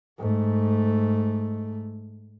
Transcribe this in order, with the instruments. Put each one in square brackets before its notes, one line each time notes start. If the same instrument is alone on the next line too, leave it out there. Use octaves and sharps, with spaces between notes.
[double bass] G#2 A3